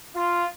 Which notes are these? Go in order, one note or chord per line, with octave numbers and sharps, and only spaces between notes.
F4